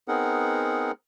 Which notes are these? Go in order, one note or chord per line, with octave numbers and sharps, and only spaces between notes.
B3 C4 D#4 G#4 A#4 F#5